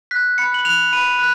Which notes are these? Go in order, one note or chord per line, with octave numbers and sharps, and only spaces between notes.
F#6 B6
B5 C#7
F#7
F#6 F7
B5 D#7
F#6